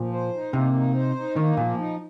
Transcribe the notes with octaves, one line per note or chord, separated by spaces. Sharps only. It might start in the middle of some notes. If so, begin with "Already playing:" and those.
Already playing: A#2 F3
C5
D#4
C3 A#3
D#4
C5
D#4
D#3 A#3
A#2 F3
D#4